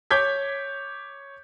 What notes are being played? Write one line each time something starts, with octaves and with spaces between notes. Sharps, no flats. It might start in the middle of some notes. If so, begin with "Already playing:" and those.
C#5 D6 G6 G#6 B6